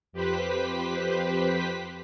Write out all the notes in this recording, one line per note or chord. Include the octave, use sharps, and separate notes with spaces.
F2 G4 B4 C5 B6